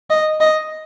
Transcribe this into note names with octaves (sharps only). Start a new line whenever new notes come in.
D#5
D#5